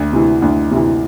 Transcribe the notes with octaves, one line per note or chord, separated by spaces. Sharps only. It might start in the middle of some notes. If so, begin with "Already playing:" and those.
Already playing: D2
C3 E3
D2
C3 E3